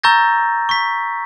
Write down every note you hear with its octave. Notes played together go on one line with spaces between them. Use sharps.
A#5 C#6 E6 G6 A6 A#6
C#6 B6